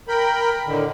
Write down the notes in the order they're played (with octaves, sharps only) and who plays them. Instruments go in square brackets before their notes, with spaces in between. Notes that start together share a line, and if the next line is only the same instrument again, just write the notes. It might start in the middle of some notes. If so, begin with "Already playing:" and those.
[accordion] A#4 G5 B5
A2 D3 D#3